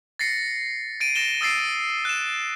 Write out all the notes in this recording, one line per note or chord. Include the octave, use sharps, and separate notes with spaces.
A6 A#6 C7 C#7
A6 D7 D#7
A6 A#6 E7 G7
D#6 E6 A6 C7 D7
F#6 E7